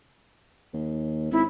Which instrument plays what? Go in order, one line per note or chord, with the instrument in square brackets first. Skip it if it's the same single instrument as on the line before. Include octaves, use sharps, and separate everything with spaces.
[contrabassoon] D#2
[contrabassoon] G#1 [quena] E4